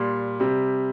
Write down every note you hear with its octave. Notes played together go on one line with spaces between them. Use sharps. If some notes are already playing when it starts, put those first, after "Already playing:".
Already playing: A#2 G3 C6
C3 G3